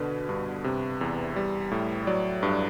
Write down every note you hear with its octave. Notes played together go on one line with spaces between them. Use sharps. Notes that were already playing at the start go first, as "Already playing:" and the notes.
Already playing: B2 D3 B4
G2
C3
E2
G3
A2
F#3 D5
G2